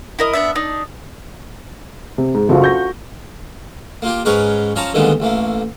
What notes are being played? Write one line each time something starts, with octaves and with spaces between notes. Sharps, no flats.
E4 A#4 D#5
B3 D4 E5
D4 D#4
C3
G#2
F#1 F4 F#4 A4
F#4 C#6 G6 A#6
A#3 F4 G4
G#2 G#3 C#4 A#4 B4 C#5
F3 C#4 C#5 A5 A#5
A#2 D3 D#3 G3 G#3 B3
A1 A3 A#3